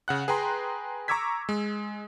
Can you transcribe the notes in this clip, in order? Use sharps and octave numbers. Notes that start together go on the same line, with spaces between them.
C#3 F#5 F#6
G#4 B4 G5 A#5 C6
A#5 C#6 D6 E6 G#6 B6
G#3